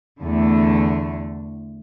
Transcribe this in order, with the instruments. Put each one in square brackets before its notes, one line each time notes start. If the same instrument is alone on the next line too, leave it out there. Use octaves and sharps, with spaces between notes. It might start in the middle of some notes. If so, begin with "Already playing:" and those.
[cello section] E2 D3 A3